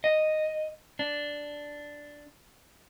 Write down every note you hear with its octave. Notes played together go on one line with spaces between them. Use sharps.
D#5
D4